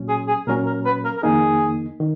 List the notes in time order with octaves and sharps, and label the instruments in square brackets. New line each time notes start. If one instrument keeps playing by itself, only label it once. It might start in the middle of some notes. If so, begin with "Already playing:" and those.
Already playing: [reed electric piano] A#2 F#3 C#4
[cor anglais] G#4
G#4
[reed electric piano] A#2 F#3 C#4 [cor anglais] A#4
[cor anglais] A#4
B4
A#4
A#4
[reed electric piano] F2 D#3 A#3 D#4 [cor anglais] G#4
[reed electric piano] D#3